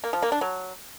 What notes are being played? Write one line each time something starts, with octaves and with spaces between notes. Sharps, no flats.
A#3
F3
A#3
D4
F#3